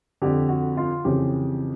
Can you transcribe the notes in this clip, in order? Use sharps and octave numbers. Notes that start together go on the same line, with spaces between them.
F2 D3 G4
F#4
F4
F2 C#3 E3 G4